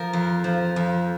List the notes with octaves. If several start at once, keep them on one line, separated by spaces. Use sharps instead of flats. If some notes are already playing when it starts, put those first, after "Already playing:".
Already playing: F3 A#4
F2
F3
F2